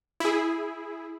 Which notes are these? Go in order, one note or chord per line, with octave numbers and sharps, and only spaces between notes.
E4 G#4